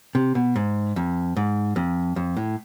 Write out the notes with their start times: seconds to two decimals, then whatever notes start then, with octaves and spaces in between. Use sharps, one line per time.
0.15 C3
0.35 B2
0.56 G#2
0.96 F2
1.37 G#2
1.76 F2
2.16 F2
2.37 A2